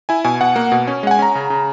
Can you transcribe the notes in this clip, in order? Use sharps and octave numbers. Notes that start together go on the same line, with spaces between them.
E4 G#5
B2 G#5
B2 F#5
A#3
B2
C#4
G#3 F#5
G#5
C#4 A#5
C#3
C#3